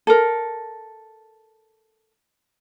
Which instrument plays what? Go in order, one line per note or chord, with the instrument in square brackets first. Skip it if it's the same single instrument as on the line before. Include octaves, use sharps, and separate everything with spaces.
[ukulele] A4 A#4